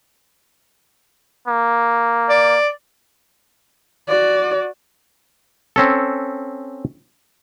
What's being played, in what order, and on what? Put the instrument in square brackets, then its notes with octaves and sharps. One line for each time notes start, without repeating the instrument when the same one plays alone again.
[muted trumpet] A#3
[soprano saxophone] D5
[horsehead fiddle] F#4 D5
[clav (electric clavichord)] C4 C#4 A4